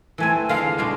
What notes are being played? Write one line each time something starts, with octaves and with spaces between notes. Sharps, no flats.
E3 A3 C4 G#5
D3 G#3 D4 F4 F5
B2 G#3 D4 F4